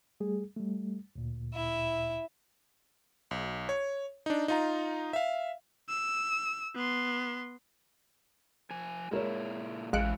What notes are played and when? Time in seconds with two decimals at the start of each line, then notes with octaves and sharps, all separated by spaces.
0.20 G3 A3 G#4
0.57 G3 A3
1.16 D2 A#2
1.54 E4 E5
3.31 B1
3.69 C#5
4.26 D4 D#4
4.48 D#4 F4 A#5
5.13 E5 F5
5.89 E6
6.75 B3 C6
8.70 F3 G#5
9.11 A#2 G#3 E4 A#4 C#5
9.93 A1 E3 F#3 G#3 F5 F#6 C#7 D7